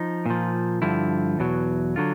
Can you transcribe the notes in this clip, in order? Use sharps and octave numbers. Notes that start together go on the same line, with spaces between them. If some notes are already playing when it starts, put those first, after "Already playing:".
Already playing: F3 D#4
A#2 F3
G2 D3 F3 E4
E2 B2 F#3
D3 F#3 F4